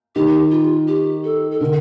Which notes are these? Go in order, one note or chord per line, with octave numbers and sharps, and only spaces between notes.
D#3 G4
F4
G4
A4
A4
D3 A#4